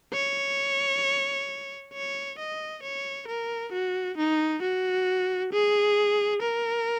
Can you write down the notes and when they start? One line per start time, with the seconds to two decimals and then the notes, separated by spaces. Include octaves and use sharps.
0.13 C#5
1.93 C#5
2.39 D#5
2.83 C#5
3.28 A#4
3.72 F#4
4.17 D#4
4.62 F#4
5.53 G#4
6.42 A#4